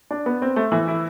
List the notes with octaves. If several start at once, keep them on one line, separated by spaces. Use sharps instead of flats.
D4
B3
C4
A3
E3
E4